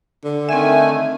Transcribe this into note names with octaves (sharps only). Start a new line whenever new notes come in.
D3
D#3 A3 C4 E5 G#5